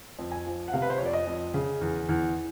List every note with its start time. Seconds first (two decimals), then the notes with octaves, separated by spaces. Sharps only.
0.19 F2
0.32 G#5
0.46 F3
0.68 F#5
0.73 C3 F5
0.82 B4
0.90 C5
0.98 F2 C#5
1.06 D5
1.13 D#5
1.27 F2
1.54 C#3
1.81 E2
2.09 E2